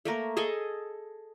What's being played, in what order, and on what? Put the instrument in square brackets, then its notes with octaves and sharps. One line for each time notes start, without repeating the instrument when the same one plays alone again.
[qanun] A3 A#3 A#4
G#4 A4 D#5 G#5